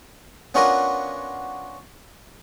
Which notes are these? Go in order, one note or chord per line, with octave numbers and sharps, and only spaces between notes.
B3 C#4 D4 F4 F#4 A#4